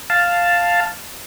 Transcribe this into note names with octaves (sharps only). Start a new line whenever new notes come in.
F5 A5